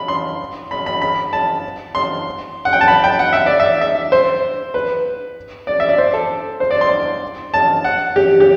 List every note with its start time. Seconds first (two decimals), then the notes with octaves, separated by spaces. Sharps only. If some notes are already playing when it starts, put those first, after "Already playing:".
Already playing: B5
0.08 C6
0.71 B5
0.86 B5
1.02 B5
1.33 A5
1.95 C6
2.65 F#5
2.73 G5
2.81 A5
2.88 B5
3.04 G5
3.19 F#5
3.33 E5
3.46 D5
3.60 E5
3.81 E5
4.12 C5
4.74 B4
5.67 D5
5.80 E5
5.89 D5
5.98 C5
6.14 A4
6.60 C5
6.71 D5
6.81 C6
7.54 A5
7.84 F#5
8.16 G4
8.40 G4